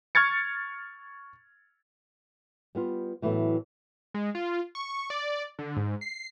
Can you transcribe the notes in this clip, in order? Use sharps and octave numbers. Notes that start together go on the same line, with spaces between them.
C#6 F6 G#6 A6 C#7
G3 B3 F4
A2 E3 F#3 A3 B3
G#3
F4
C#6
D5
D3
G#2
C7